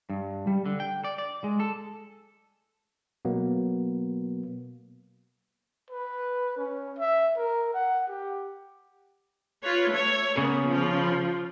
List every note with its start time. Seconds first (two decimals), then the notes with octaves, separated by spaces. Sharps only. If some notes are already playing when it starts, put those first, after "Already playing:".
0.10 G2
0.47 G3
0.66 D3
0.80 G5
1.04 D5
1.18 D5
1.44 G#3
1.60 A4
3.25 B2 F#3 A#3 B3
5.90 B4
6.57 C#4
6.98 E5
7.37 A#4
7.74 F#5
8.07 G4
9.63 F4 B4 C#5
9.92 A3 C#5
10.37 C#3 A#3 B3
10.70 F3 F4